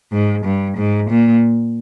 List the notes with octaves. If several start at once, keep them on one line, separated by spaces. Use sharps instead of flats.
G#2
G2
G#2
A#2